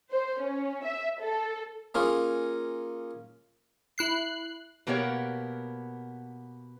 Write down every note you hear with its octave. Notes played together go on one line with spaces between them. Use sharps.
C5
C#4
E5
A4
A#3 C#4 D#4 F4 G#4
E4 F#6 C7
B2 A#3 B3 G4 A#4 C#5